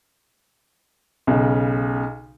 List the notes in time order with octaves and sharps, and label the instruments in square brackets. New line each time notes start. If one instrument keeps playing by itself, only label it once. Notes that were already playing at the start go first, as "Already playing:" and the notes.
[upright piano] B1 C#3